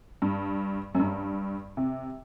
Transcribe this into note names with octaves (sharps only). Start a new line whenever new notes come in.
G2
F#2
G2
C3